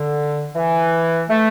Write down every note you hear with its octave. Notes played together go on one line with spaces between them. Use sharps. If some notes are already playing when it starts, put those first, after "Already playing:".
Already playing: D3
E3
A3